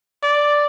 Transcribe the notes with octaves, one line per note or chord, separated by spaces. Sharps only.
D5